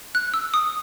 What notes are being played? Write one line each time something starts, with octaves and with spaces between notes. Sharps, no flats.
F#6
E6
D#6